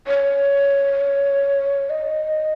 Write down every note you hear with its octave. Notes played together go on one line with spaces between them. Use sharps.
C#5
D#5